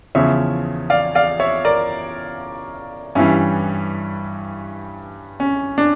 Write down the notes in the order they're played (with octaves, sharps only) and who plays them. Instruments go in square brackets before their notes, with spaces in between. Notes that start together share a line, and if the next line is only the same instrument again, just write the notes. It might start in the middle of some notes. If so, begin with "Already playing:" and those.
[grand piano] E2 C#3 F3 C#5 E5
D5 F5
D5 F5
C#5 E5
A#4 D5
G2 E3 G3 C#4 E4
C#4
D4